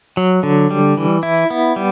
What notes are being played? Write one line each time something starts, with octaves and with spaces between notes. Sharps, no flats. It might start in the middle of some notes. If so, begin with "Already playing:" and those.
F#3
D3
G3
E3
E4
B3
G3